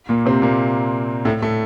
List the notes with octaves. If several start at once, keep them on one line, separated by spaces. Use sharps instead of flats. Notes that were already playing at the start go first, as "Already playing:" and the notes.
A#2 A#3
C3 C4
A#2 A#3
A2 A3
A2 A3